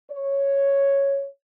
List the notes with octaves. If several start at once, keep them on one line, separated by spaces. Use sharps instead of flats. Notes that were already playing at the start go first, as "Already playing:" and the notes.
C#5